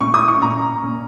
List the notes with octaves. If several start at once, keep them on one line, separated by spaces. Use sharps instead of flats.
A#2 A#3 C#4 C#6
D#6
C#6
A#2 A#3 C#4 A#5
A#2 A#3 C#4